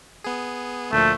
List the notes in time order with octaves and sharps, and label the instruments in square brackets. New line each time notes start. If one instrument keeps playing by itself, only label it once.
[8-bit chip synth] B3 G#4
[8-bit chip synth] D2 A#2 F3 [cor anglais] A3